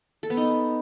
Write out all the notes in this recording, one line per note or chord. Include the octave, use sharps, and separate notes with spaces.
A4
B3
D#4